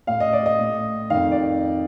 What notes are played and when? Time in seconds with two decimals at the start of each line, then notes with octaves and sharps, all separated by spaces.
0.07 A2 F5
0.20 D#5
0.33 D5
0.46 D#5
0.59 A2
1.10 F2 D#3 F5
1.32 D5